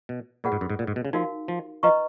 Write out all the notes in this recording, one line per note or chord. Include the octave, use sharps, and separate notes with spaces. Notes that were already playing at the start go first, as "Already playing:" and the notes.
B2
A#2 F4 G#4 B4 F#5
G#2
F#2
G#2
A#2
G#2
B2
C#3
F3 D#4 F#4 A#4 F5
F3
F3 B4 D#5 A#5 C#6